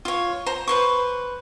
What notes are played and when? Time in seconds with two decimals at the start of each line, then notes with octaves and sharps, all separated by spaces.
0.05 F4 C#5
0.46 C5 A#5
0.68 B4 C5 C#6